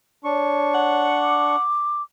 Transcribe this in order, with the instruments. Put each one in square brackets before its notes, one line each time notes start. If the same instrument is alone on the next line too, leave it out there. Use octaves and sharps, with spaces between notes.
[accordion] D4 C#6 [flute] C#5
[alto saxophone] F#5
[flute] D6